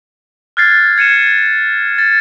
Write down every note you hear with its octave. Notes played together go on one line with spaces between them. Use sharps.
F6 F#6 G#6 A6 C7
G#6 C#7 D#7 E7
A6